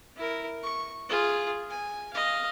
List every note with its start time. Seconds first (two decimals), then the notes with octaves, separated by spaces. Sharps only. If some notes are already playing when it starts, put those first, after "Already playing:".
0.16 E4 A#4
0.63 C#6
1.09 F4 G#4
1.70 G#5
2.13 D#5 F5